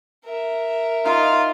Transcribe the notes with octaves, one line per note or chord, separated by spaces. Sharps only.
A#4 E5
D#4 F4 F5